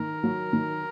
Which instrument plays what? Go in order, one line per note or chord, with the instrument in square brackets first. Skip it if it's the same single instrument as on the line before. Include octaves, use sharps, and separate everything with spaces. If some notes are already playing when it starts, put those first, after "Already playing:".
Already playing: [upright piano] D#3 [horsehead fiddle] A#4
[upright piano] F#3
D#3